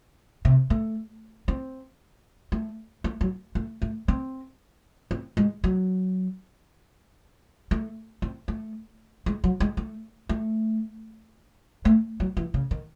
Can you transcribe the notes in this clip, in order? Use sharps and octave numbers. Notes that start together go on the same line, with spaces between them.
C3
A3
C4
A3
A3
F#3
A3
A3
C4
C4
G#3
F#3
A3
C4
A3
G#3
F#3
G#3
A3
A3
A3
F#3
E3
C#3
D#3